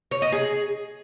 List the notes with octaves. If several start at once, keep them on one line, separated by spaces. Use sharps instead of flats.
C#5
D#5
G#4